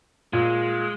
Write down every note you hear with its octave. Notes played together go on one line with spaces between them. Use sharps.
A#2 G#3